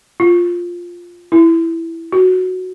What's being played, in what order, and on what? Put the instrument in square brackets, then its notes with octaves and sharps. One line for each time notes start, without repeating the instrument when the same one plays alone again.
[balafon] F4
E4
F#4